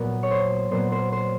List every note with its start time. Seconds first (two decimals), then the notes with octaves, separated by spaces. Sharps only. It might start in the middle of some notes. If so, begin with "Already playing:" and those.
Already playing: A#2 F#3 B3
0.23 C#5
0.31 C5
0.71 A#2 F#3 B3 C5
0.92 C5
1.12 C5